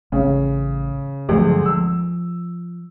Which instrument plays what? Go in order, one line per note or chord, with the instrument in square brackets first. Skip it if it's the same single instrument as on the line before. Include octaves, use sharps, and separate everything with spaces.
[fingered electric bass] A1 [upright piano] C#3
[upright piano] D2 G#3 [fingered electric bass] G2 F3 F#3
[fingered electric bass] F3 [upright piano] E6